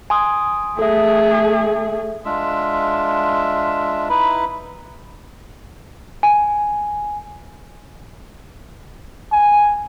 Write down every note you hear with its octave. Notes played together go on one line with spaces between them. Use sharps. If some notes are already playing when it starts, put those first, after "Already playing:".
G#5 C6 D#6
A3 G#4 A4 E5
G#3 D4 F4 E5
D#4 E4 B4 B5
G#5
G#5